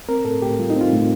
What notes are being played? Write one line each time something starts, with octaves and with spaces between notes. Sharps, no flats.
C4 A#4
A2 A4
A2 G4
G3 F4
D#4
C4 F4
A2